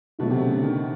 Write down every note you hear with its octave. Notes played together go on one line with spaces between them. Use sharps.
B2 D#3 F#3 A3
C3
C#3
D3
D#3